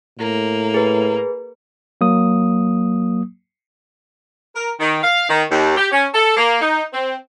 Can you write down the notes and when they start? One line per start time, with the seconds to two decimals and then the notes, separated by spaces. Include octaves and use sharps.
0.19 A2 A#3
0.74 G#4 B4
2.01 F#3 A#3 D#6
4.55 A#4
4.80 D#3
5.03 F5
5.29 D#3
5.51 D#2
5.77 G4
5.92 C#4
6.14 A4
6.37 A#3
6.62 D#4
6.94 C4